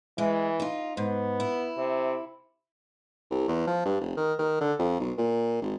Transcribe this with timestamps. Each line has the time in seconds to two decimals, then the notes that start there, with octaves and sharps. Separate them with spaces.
0.18 E3 G#3
0.60 D#4 F4
0.97 G#2 B3
1.40 E4
1.77 C3
3.31 C2
3.48 E2
3.67 F3
3.85 G2
4.01 F1
4.17 D#3
4.39 D#3
4.61 D3
4.79 F2
5.00 B1
5.18 A#2
5.62 G#1